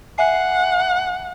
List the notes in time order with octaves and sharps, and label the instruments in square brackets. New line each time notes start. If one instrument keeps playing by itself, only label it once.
[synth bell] E5 G#5 C7 [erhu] F#5